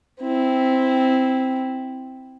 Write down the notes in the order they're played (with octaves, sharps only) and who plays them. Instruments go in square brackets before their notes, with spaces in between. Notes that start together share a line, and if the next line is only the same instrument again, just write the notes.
[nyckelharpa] C4 E4